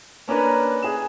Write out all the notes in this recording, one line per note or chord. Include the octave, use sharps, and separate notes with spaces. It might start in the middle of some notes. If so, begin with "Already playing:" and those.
A#3 C#4 D4 A#4 B4
G#4 E7